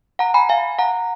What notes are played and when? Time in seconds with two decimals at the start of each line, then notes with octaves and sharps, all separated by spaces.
0.19 F#5 A#5
0.34 G#5 B5
0.49 F5 G#5
0.79 F#5 A#5